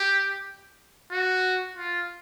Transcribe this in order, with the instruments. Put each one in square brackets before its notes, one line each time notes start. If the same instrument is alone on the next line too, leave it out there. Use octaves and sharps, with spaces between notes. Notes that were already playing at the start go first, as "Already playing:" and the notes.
Already playing: [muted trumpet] G4
F#4
F4